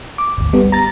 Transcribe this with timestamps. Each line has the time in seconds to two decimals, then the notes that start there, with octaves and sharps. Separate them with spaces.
0.18 D6
0.38 G#1 D2
0.53 G3 B3
0.72 A#5 A6